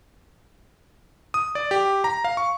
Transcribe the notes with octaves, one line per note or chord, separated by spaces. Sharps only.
D#6
D5
G4
A#5
F5
C#6